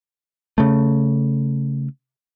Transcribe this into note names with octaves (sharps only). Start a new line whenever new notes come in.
C#3 A3